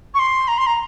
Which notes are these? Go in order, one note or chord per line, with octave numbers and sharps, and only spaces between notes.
C#6
C6
A#5
C6
A#5